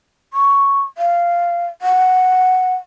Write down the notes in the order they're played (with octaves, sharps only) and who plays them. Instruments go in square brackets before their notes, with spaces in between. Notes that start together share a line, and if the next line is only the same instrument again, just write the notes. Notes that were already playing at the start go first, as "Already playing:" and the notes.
[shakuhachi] C#6
F5
F#5